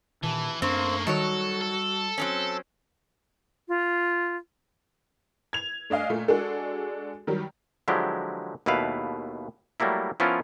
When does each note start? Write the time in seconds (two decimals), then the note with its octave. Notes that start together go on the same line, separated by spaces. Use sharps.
0.23 A#2 D#3 E3 A5
0.62 F#2 A3 A#3 C4 D4 C5 C#6
1.07 D#3 F#3 G3 F#4 A4 C#5
1.62 A4
2.18 F#3 C4 C#4
3.68 F4
5.53 G#6 F7
5.90 A3 D4 D#5 F5 G#5
6.10 A#2 A3
6.28 G#3 D4 F#4 G#4 A4
7.27 D#3 F#3 G3
7.88 D3 F3 F#3 G#3 E4 G4
8.66 D#2 B2 A3 E4 B4 F5
9.80 F#3 G3 A3 A#3 E4
10.20 F3 B3 C#4 E4 F4 A#4